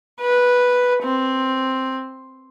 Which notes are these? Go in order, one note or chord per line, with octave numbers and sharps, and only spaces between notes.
B4
C4